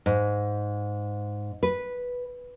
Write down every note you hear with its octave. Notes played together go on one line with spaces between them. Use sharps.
G#2
B4